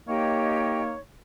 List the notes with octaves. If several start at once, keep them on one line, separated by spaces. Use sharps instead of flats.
A#3 D#4 G4 C#5 D#5 G5